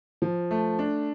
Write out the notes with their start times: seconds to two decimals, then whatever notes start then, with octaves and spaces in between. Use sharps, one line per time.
0.22 F3
0.51 A3
0.79 D4